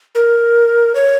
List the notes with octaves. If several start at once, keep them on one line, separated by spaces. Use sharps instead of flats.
A#4
C#5